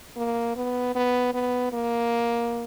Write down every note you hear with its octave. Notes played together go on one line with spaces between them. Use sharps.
A#3
B3
B3
B3
A#3